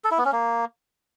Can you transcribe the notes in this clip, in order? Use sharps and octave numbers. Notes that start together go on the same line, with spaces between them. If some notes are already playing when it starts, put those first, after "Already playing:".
A4
E4
B3
C#4
A#3